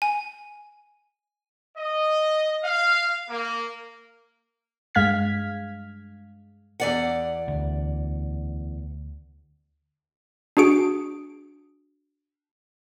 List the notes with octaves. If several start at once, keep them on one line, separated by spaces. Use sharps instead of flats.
G#5
D#5
F5
A#3
G2 G#3 F5 F6 G#6 B6
E2 D5 F#5
D2
D4 F#4 G#4 D7